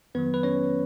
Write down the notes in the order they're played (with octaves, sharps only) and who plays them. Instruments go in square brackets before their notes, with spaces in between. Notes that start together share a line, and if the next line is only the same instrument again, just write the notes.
[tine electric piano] F2 D#3 F#3 B3 B4
B4
C#4 C#5